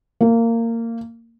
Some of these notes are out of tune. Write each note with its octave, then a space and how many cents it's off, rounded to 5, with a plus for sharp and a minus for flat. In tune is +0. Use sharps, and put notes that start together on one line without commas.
A#3 -20